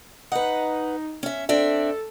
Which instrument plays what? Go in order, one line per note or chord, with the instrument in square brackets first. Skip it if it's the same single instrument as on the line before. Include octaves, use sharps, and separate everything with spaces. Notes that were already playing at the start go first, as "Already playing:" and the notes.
[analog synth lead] D#4 [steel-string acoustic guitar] B4 F#5
[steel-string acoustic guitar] C#4 E5
[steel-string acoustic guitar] C4 D4 E5 [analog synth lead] A4